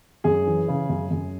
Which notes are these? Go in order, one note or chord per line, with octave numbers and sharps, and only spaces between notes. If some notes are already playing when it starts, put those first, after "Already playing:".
F#2 G#4
E3
C#3
F#2
F#2